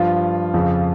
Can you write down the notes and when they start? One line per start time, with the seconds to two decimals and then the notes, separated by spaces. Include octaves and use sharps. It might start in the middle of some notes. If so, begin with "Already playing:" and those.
Already playing: G2 F3 F4
0.54 F2 C#3 F3